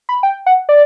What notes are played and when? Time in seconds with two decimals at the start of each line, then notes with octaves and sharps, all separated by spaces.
0.09 B5
0.23 G5
0.46 F#5
0.69 D5